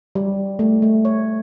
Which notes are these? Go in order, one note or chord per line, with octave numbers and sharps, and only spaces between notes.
G3
A3
A3
C#5